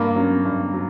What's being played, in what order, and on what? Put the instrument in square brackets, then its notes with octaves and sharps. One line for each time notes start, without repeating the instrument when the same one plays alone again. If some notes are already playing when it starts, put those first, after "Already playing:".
Already playing: [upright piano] G2 [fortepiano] A#3
[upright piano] F#3 C#4
G2
F#3